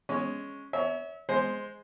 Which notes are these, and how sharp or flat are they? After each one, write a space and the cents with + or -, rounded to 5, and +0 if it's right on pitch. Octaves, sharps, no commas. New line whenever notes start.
G#3 +0 C#4 +0 C#5 +0
C#5 +25 E5 -30
G#3 +0 C5 +0